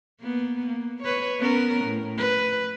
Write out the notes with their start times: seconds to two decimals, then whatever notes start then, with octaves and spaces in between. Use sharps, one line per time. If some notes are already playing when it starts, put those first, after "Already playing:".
0.21 A#3 B3
0.66 A#3
1.03 B4 C#5
1.39 B3 C#4 A#4
1.85 A2
2.17 B4